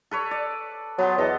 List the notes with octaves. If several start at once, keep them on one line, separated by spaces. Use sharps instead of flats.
A4 B4 C#5
D5
F#3 B3 C5
E2 A4 D#5